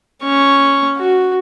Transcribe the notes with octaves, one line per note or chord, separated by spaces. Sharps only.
C#4 C#6
F#4